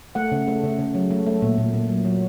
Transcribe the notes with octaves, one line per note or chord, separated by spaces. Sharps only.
A3 F#5
C#3
A3
C#3
C#3
F#3
A3
A3
A#2
A#2
A#2
F#3
F#3